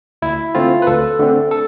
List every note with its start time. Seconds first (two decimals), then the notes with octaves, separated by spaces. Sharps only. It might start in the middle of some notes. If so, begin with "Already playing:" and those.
0.22 D2 E4
0.55 D3 A3 C4 F4
0.82 B4
0.87 D2 A4
1.19 D3 A3 C4
1.51 A4